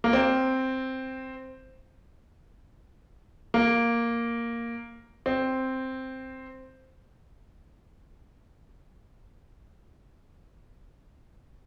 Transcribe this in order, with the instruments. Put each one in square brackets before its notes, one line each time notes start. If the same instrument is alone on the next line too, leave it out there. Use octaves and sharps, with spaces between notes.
[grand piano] A#3
C4
A#3
C4